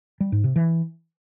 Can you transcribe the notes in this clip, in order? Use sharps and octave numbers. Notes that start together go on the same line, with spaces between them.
G3
G#2
C3
E3